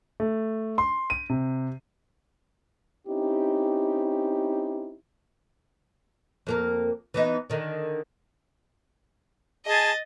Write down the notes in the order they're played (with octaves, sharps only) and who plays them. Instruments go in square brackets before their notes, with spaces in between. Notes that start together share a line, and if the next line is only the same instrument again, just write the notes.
[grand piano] A3
C6
D#7
C3
[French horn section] C4 C#4 D#4 E4 G4
[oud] F2 A#3 A#4
E3 B3 D#4
D3 D#3
[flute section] G#4 G#5 A5 [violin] D#5 A6